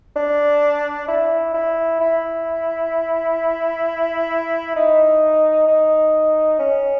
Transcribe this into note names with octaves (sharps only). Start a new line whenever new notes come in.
D4
E4
E4
E4
D#4
D#4
C#4